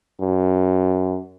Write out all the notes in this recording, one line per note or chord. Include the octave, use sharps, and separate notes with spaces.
F#2